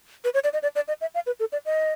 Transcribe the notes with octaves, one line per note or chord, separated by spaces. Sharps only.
B4
C#5
D5
D#5
D5
D5
D#5
E5
F5
B4
A4
D5
D#5